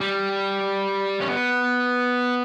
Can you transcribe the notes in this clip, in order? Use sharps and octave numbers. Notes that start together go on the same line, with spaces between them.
G3
C#4
B3